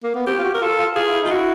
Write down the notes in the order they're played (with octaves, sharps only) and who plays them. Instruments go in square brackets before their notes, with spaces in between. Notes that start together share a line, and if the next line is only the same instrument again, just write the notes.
[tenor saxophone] A#3
B3
[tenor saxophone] C4 [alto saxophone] G4
[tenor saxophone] F4
F#4
[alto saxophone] A#4
[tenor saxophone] F4 [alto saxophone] A4
[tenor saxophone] F4
[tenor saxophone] F4 [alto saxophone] G#4
[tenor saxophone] E4
[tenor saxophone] D#4 [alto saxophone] F4
[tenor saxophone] E4 [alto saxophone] F#4